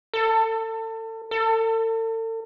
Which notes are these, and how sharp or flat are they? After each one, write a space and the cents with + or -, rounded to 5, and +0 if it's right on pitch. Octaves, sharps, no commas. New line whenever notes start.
A4 +30
A4 +40